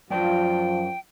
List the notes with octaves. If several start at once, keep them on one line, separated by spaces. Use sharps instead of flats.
F#2 F3 F4 D5 G5 A5